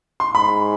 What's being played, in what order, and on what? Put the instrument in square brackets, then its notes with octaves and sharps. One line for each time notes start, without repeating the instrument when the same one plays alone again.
[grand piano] C6
[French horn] G#2 [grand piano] B5